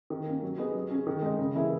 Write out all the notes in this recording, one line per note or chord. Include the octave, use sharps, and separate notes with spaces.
D#3
A#3 C#4
F#3
B3 D#4 G#4
F#3
C#4 G#4
D#3
G#3 D#4
C#3
E3 A#3 E4 G#4